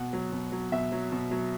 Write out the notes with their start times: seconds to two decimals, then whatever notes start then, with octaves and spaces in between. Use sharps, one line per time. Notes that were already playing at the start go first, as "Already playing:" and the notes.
Already playing: B2 F#5
0.13 F#3
0.32 B2
0.52 F#3
0.72 B2 E5
0.92 F#3
1.12 B2
1.31 F#3